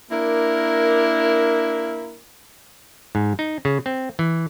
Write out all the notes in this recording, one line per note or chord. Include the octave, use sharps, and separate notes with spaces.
A#3 D4 E4 A#4
G#2
D#4
C#3
C4
E3